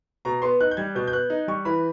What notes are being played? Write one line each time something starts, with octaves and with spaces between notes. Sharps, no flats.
B2 A#5
B3 C6
D#4 F#6
G6
G3 G#6
B2 G6
G6
B3 F#6
D#4
G3 C#6
E3 B5